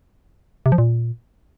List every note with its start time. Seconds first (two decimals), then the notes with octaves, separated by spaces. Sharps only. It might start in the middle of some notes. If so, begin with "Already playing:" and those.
0.66 C3
0.72 F3
0.78 A#2